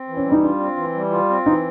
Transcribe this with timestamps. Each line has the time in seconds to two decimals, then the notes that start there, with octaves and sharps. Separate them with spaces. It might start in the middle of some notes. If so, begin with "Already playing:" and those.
Already playing: C4
0.09 E3
0.17 C#4
0.25 G3
0.32 D#4
0.42 D4 F4
0.59 C4
0.77 E3
0.95 G3
1.11 F4
1.29 C4
1.45 E3 D#4